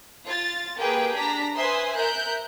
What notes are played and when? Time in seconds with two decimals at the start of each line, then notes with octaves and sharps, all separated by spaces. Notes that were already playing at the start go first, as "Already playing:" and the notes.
0.25 F4 A6
0.77 A#3 G4 G#4 B4 G5
1.18 D4 A#5 B6
1.55 B4 C5 E5 G#5 C6 D#6
1.96 A#4 E5 F#6 G6